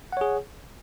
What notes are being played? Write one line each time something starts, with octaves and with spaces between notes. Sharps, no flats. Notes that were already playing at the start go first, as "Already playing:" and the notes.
G#4 C#5 F#5